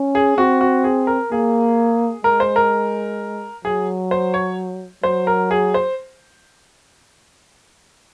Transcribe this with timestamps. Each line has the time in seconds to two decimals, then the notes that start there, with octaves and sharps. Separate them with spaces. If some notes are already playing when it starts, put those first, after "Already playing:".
Already playing: C#4
0.15 G#4
0.37 C4 F#4
0.61 F#4
0.84 G#4
1.07 A#4
1.32 A#3 G#4
2.24 G#3 A#4
2.40 C5
2.56 A#4
3.65 F#3 G#4
4.11 C5
4.34 C#5
5.03 F#3 C5
5.27 A#4
5.51 G#4
5.74 C5